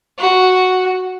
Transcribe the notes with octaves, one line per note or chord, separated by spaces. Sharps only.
F#4